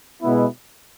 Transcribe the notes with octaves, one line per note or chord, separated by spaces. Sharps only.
B2 G#3 B3 E4